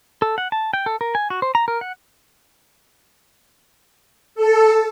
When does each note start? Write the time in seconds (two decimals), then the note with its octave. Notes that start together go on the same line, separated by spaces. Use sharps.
0.22 A4
0.38 F#5
0.52 A5
0.73 G5
0.86 A4
1.01 A#4
1.15 G#5
1.30 F#4
1.42 C5
1.55 A#5
1.68 A#4
1.81 F#5
4.35 A4